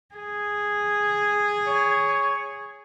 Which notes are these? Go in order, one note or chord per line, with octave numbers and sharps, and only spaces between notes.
G#4
C#5